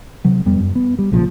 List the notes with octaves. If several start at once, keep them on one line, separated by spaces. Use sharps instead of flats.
C3 F#3
F2 G3 B3
F#2
B3
G3
B1 A#2 C#3 F3